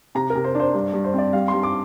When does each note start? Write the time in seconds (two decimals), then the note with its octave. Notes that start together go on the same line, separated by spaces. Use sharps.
0.15 C3 A#5
0.30 A#4
0.35 C3
0.44 C5
0.55 D4 C5
0.74 G2
0.93 G2
1.04 C5
1.14 C4 D5
1.33 G3 F5
1.48 C6
1.53 G2
1.63 D6